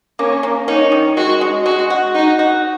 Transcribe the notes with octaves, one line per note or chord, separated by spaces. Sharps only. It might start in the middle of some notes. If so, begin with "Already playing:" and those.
A#3 C#4
A#3
C#4 D#4
D#3
G#3 F#4
G#3
G#3 F#4
F#4
D#4 F#4
F#4